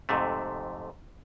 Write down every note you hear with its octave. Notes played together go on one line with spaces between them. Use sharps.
F2 G#2 C3 A3